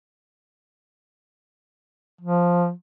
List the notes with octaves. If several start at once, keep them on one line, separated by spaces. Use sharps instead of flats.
F3